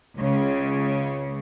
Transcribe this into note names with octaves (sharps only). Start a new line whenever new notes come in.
C#2 C#3